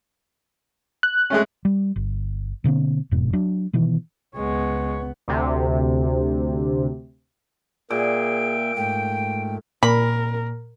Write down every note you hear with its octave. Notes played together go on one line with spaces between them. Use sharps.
F#6
G#3 A3 C#4
G3
G1
B2 D3 A#3 C4
E1 F2 G#2 B2
F#3 D4
B2 D#3 E3 B3
C#2 G#3 B3 C#5
D2 C3
A#2 A#3 G#4 E5 G5 D7
G#2 A3 G5
A#2 A#4 B5